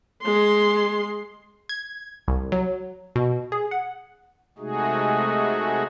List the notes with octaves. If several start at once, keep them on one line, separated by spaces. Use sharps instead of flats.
G#3 C6
G#6
C2
F#3
B2
G#4
F#5
C3 G#3 A3 D#4 F#4 G#4